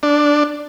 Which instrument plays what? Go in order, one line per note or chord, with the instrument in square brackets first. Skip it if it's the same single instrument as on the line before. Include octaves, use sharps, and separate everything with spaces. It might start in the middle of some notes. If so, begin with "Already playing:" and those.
[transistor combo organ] D4